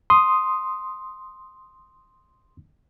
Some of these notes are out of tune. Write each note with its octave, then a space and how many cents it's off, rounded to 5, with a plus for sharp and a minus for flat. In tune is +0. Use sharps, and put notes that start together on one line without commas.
C6 +0 D#6 +0